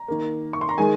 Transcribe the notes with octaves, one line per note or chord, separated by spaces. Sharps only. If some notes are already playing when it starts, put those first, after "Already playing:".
Already playing: A#5
D#3 A#3
C#6
C6
A#5
D#3 G#3 G#4 G#5